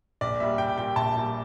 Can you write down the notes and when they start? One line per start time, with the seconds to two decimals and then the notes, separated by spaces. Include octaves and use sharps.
0.21 A#1 D5
0.40 A#2 G3 E5
0.58 A#1 G5
0.78 A#2 G3 G5
0.96 A#1 A5
1.15 A#2 G3